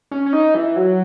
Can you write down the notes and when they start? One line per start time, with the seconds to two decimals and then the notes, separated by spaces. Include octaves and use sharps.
0.11 C#4
0.26 C#4
0.33 D#4
0.55 E3
0.76 F#3